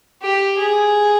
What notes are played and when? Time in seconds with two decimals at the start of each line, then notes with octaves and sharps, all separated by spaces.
0.22 G4
0.58 G#4